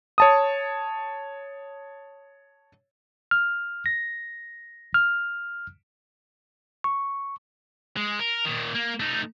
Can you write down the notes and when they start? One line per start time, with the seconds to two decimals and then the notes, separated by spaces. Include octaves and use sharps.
0.18 C#5 A5 D#6
3.31 F6
3.86 A#6
4.94 F6
6.84 C#6
7.97 G#3
8.19 A#4
8.45 A#2 D#3
8.75 A#3
9.00 A3 D#4